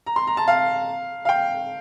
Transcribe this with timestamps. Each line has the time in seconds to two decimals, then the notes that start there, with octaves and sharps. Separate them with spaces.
0.06 A#5
0.16 C6
0.27 A#5
0.37 A5
0.48 F5
1.25 F5
1.29 G5